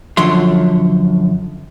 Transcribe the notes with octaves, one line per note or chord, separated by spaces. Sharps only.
F#2 D3 F3 C#5 E5 C6